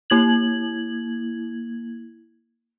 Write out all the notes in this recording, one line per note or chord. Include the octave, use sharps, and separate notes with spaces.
A#3 E4 G#6 F#7